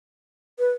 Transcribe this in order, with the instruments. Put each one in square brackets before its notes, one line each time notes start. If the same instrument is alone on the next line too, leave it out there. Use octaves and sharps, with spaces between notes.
[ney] B4